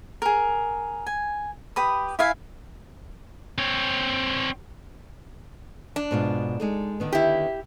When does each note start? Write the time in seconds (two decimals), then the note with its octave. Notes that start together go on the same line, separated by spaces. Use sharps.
0.22 G#4 A#4
1.07 G#5
1.76 G4 B4 B5 D#6
2.19 E4 E5 F5 G#5
3.58 C4 C#5
5.96 D4
6.11 G#2 B2 F4
6.60 G#3 D#4 A4
7.00 D3 D#3 B3
7.13 E4 G4